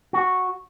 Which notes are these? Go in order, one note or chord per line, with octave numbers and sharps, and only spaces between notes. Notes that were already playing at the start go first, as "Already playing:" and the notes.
F#4